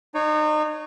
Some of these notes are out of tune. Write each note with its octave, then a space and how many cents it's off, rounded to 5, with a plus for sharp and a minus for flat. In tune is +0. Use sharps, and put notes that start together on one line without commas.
D#4 -35 C#5 +0